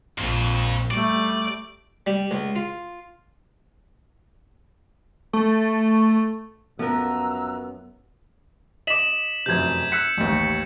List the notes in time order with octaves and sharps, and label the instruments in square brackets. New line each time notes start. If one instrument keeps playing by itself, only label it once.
[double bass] A#1 [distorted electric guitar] F2
[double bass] G3 A3 [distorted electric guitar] D5
[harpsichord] G3
C#2
F4
[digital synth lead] A3
[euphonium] F#2 [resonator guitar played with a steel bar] F3 A#4 [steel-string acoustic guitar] B3 [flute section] A#5 E6 F#6
[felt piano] D#5 D6 [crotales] B6 E7 F#7
[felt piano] F1 F#2 C3 [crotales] G6 G#6
[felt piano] E6 F#6 [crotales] B6 C#7
[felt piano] A1 D#2